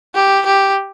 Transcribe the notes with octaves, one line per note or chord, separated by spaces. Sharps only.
G4
G4